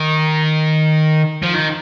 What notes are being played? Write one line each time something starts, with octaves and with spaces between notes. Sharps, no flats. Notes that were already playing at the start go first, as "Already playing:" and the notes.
Already playing: D#3
F3
D#3